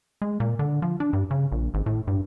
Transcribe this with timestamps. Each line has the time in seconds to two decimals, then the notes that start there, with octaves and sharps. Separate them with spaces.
0.22 G#3
0.40 A#2
0.59 D3
0.82 F3
1.00 D4
1.13 G2
1.31 C#3
1.52 A#1
1.74 G#1
1.86 A2
2.07 G2